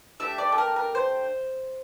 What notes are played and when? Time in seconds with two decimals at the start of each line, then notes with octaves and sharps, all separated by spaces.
0.20 A3 D4 G4 E5
0.38 D5
0.52 A4
0.58 A#4
0.76 A#4
0.95 C5